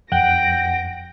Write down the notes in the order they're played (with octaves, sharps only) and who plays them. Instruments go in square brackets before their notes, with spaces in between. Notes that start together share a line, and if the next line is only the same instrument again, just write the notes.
[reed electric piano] F2 [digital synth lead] F#5 [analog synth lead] G5 [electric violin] A#6 D7